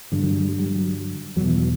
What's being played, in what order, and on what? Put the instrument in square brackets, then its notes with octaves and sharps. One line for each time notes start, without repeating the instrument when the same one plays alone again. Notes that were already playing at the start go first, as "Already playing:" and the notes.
[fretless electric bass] G2 D3 G3
F#3
G3
G3
G3
F#3
E2 F#3
B2
E3
F#3